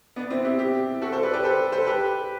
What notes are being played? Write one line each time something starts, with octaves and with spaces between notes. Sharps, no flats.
B3 D4
C4 E4
E4 G4
E4 G4
F#4 A4
A4 C5
B4 D5
G4 B4
A4 C5
A4 C5
G4 B4